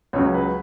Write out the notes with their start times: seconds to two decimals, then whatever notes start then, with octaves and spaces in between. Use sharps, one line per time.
0.13 C#2 C#3 F#3 C#5
0.34 B4